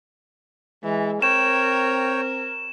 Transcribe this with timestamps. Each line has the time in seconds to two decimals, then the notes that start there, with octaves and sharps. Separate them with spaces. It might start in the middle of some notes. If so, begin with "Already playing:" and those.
0.84 E3 G#3
1.22 C4 A#4 C#5 G5 E7